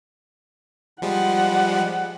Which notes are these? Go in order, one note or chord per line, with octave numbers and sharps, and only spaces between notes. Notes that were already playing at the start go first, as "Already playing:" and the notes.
F3 G3 G#3 F#5